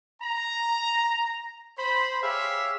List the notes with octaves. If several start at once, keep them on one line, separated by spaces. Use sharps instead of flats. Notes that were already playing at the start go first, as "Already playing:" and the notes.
A#5
C5 B5
G4 G#4 C#5 E5 F5